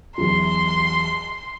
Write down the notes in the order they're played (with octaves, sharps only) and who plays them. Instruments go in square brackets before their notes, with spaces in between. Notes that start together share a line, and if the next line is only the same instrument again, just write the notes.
[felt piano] E2 E3 F#3 [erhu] C6